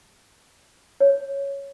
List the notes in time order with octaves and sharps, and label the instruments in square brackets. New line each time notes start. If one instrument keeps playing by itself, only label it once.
[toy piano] C#5